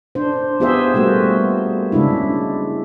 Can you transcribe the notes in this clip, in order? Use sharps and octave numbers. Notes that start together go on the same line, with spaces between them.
D4 C5
B3 F4 G4 G#4 C5 E5
G3 A3 A#3 F#4
C#3 G#3 D4 E4